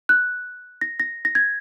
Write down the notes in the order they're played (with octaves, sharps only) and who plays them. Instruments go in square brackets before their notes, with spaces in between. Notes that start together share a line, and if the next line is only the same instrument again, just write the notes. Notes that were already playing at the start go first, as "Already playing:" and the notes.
[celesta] F#6
A#6
A#6
A#6
G#6